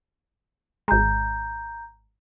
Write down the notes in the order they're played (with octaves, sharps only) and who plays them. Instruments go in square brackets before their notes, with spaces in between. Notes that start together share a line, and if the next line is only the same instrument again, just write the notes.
[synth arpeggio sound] G#1 G#3 [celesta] A#5 G6